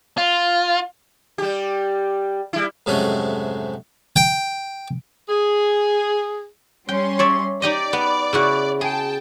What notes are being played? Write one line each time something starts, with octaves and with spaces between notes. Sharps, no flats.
F4
G3 G4
G3 E4
F2 G#2 C3 F#3 A3 C#4
G5
G#4
G3 C#4 G5 C6
C#5 D5 E5
D#4 G4 D5 D#5
B3
C#3 E4 F#4
G#4 G5 A5